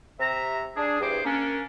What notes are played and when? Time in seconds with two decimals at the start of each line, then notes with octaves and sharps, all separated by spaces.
0.19 C3 E5 A#5
0.76 D4 G#4
1.01 E2 G2 G#4 C5 D6
1.24 A#3 C#4 D4